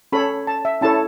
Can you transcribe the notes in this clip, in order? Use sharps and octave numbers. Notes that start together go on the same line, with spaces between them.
C#4 A4 C#5 B5
A5
E5
C#4 E4 A4 C#5 A5